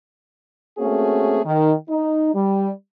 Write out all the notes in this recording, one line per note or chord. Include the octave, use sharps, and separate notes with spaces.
A3 A#3 C4 C#4 F#4 G#4
D#3
D#4
G3